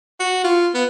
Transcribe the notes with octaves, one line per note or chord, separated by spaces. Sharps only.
F#4
F4
B3